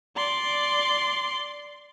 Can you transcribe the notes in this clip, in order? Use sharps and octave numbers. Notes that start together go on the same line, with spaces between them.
D5 C6